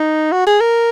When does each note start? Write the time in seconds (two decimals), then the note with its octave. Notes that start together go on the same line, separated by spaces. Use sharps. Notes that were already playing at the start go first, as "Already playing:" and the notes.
Already playing: D#4
0.32 F#4
0.46 G#4
0.60 A#4